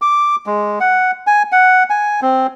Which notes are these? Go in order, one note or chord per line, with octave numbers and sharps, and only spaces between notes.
D6
G#3
F#5
G#5
F#5
G#5
C4